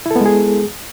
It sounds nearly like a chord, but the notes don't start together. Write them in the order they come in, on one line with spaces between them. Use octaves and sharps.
E4 A4 B3 G#3 G#4